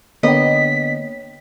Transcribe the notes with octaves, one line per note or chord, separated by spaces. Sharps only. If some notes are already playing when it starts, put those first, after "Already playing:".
D3 A#3 B3 C#5 D#5 G5 B6